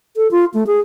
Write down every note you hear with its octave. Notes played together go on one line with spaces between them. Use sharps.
A4
F4
A3
G#4